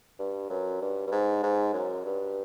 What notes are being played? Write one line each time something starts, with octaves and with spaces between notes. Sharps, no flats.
G2
F#2
G2
G2
G#2
G#2
F#2
G2